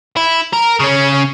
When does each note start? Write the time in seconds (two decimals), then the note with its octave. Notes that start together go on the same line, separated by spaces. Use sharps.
0.17 E4
0.53 A#4
0.80 C#3 C#4